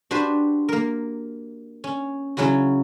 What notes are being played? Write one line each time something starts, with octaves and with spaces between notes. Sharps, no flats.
D4 F#4 G4 B4 C5
A#3 A#4
C#4
C#3 F#3 C#4 E4 F#4